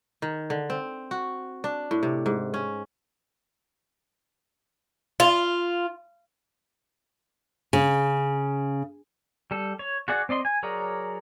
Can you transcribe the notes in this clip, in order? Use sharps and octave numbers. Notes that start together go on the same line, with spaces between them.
D#3
D3
C4
F#4
D4
A2
C3
G#2
C#4
F4
C#3
G3 A4
C#5
F#4 G#4 D5 F#5
C4 D5 D#5 C6
G#5
F#3 G#4 A#4 C#5 D5